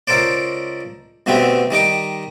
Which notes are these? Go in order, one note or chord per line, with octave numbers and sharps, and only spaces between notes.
C#2 A4 A#4 C5 D5
B2 D3 A3 B3 C4 G4
D#3 G3 D#4 D6